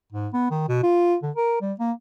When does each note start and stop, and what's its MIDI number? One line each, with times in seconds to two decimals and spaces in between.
0.13 0.28 44
0.33 0.50 59
0.51 0.66 51
0.69 0.81 47
0.83 1.16 65
1.22 1.31 50
1.36 1.59 70
1.62 1.73 55
1.79 1.92 58